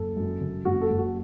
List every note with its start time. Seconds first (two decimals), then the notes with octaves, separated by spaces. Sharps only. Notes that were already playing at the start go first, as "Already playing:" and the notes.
Already playing: F#1 A4
0.17 F#2
0.41 C#3
0.65 F#1 F#4
0.81 A4
0.90 F#1
0.98 F#4